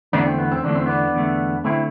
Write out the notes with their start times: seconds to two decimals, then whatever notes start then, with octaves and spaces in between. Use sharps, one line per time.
0.13 E2 D3 A3 B3 D4
0.26 C4
0.39 B3
0.52 C4
0.64 E2 D3 A3 D4
0.75 C4
0.86 B3 D4
1.14 E2 D3 A3
1.64 D3 A3 C4 E4